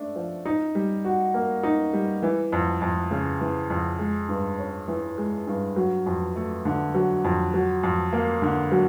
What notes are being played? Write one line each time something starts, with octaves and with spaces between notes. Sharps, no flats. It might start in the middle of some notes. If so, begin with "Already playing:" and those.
Already playing: A3 D4
F3
D#4
G3
F#4
A#3
D#4
G3
E3
F2
F2
C#3
E3
F2
G#3
G2
C#4
E3
G#3
G2
F#3
F2
A3
D3
F#3
F2
F#3
F2
A#3
D3
F#3